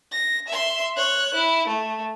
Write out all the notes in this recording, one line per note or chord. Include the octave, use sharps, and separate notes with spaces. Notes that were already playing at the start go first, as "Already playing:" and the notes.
A#6
E5 C6
C#5 F#6
E4
A3